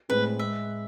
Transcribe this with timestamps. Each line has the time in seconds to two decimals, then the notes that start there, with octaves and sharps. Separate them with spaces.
0.09 A2 G#3 C4 G#4 B4
0.39 G#3 E5